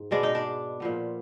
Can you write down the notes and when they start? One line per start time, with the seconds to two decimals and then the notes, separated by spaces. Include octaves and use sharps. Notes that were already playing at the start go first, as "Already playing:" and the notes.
Already playing: G#2
0.11 B2 G#3 B3 D4 D5
0.23 D#4 D#5
0.35 D4 D5
0.80 A#2 F3 B3